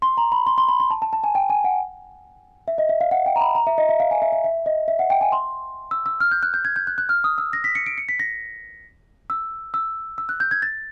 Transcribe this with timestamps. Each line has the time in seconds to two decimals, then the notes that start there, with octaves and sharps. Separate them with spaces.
0.02 C6
0.17 A#5
0.32 B5
0.46 C6
0.58 C6
0.68 B5
0.80 C6
0.91 A5
1.02 A5
1.13 A5
1.24 G#5
1.35 G5
1.50 G#5
1.64 F#5
2.68 E5
2.78 D#5
2.89 E5
3.01 F5
3.11 F#5
3.26 G5
3.36 A#5
3.41 B5
3.55 A#5
3.67 E5
3.78 D#5
3.89 E5
4.00 F5
4.11 G#5
4.22 E5
4.32 E5
4.44 E5
4.66 D#5
4.88 E5
4.99 F#5
5.10 G5
5.21 G#5
5.32 C6
5.91 E6
6.06 E6
6.20 F6
6.31 G6
6.43 F#6
6.54 G6
6.65 G#6
6.76 G6
6.87 F#6
6.98 F#6
7.09 F6
7.24 D#6
7.38 E6
7.53 A#6
7.64 B6
7.75 C#7
7.86 D7
7.98 C#7
8.09 B6
8.19 A#6
9.30 E6
9.74 E6
10.18 E6
10.29 F#6
10.40 G6
10.51 G#6
10.62 A6